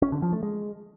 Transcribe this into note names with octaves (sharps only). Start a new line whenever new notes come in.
C#4
D3
F3
A3
G#3